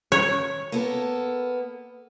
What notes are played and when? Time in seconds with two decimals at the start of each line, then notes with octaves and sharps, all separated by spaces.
0.12 C#5
0.72 A#3 B3 A4